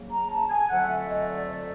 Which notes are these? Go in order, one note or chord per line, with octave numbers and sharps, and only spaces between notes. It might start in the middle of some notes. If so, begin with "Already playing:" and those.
Already playing: C#3 F#3 A#3
A#5
A5
G#5
F2 D3 F#3 A3 F#5
E5
D#5
D5
D5